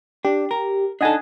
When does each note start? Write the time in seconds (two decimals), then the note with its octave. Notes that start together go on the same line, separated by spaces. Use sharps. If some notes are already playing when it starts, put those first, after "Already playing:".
0.25 D4 G4
0.51 A#4
1.01 D4 D#4 A4 D#5 F#5 G#5